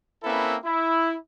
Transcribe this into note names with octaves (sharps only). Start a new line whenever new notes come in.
A#3 C4 C#4 E4 A4 B4
E4